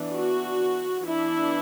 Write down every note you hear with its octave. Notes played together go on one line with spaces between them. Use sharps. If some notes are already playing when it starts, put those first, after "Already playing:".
Already playing: E3 B3 D4
F#4
E3 B3 D4 E4